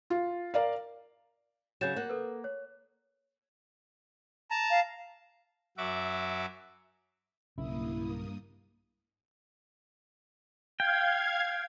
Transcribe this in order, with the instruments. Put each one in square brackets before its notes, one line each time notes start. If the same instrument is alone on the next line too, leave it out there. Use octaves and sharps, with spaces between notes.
[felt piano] F4
A#4 D5 F5
[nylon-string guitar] C#3 F#3 [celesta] G6 A6 E7
[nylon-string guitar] A#3 F#5
[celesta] A4 B4
C#5
[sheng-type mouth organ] A5 A#5
[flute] F5
[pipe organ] F#2 F#4 E5 D6
[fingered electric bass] B1 C#3 [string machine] G2 A#3 D#6 [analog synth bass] E4
[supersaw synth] F5 G#6 [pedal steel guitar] G5